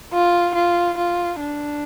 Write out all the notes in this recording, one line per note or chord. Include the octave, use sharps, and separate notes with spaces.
F4
F4
F4
D4